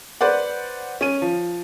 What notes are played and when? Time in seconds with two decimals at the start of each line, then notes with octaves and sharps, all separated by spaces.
0.21 B4 C5 D5 F#5
1.01 C#4 D#7
1.22 F3